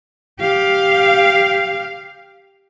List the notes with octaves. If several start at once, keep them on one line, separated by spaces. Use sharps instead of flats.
G4 F5